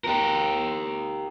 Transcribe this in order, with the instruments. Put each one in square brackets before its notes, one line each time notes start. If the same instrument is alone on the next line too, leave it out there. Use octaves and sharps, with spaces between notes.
[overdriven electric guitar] G4 A#4